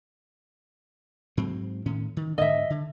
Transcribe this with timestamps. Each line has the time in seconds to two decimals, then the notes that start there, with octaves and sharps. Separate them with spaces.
1.37 G#2 F#3 C4
1.86 A2 D#3 C#4
2.17 D#3
2.38 G#2 D3 D#5 E5
2.70 D3